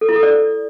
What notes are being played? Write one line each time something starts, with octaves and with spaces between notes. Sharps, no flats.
A4
E4
A4
D5